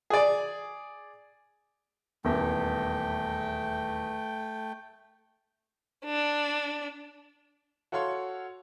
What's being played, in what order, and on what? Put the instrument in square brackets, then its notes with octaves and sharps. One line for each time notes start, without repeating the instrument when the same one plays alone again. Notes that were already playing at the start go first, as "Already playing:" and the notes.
[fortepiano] G#4 D5
[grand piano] D#1 E2 [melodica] A3 G5
[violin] D4
[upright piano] F#4 A4 C#5 F5 C6